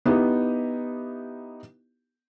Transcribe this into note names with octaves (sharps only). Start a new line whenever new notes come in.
B3 D#4 E4 G4